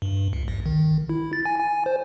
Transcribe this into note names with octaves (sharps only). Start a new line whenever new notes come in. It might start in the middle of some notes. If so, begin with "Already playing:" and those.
G2
C#2
A#1
D#3
E4
A6
G#5
G#5
C5